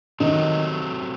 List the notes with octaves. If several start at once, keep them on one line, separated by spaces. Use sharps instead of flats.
C3 D#3 F#3 A3 D#4